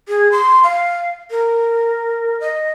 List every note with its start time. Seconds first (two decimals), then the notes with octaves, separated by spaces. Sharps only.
0.09 G#4
0.32 C6
0.64 F5
1.31 A#4
2.40 D#5